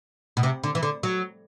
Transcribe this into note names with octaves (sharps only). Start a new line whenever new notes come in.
B2
C3
D3
E3
D3
F#3